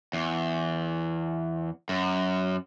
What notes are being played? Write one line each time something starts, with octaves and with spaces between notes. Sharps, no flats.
E2
F#2